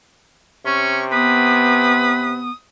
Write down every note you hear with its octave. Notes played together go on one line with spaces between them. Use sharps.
C3 C#4 C#6
B3 B4 D#6